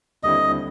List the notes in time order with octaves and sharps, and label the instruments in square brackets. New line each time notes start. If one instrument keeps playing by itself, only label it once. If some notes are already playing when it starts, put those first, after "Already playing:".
[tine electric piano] D#2 D3 G3 C4 E4 [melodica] D#5